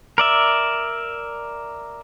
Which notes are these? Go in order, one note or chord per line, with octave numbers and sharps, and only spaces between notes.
A#4 D5 E5